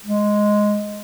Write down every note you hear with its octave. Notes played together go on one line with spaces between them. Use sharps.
G#3